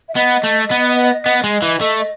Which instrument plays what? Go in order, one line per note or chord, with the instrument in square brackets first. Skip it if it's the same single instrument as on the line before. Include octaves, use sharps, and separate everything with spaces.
[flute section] E5
[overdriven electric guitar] B3 [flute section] D#5
[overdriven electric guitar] A3
B3
B3
G#3
E3
A3